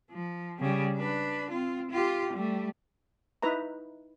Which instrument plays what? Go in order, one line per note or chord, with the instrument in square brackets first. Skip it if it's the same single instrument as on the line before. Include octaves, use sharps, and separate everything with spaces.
[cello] F3
C#3 G3
D4 B4
C4 F4
F4 G4
G3 A3
[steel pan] D#4 E4 B4 E5 A#5